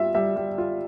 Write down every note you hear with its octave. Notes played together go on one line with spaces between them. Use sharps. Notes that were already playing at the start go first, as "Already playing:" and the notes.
Already playing: G3 F4 E5
G3 E5
G3
F4